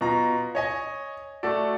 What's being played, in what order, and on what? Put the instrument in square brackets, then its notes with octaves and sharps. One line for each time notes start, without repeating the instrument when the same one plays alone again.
[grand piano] B2 F4 A#5
C#5 D#5 G#5
A3 F#4 A4 D5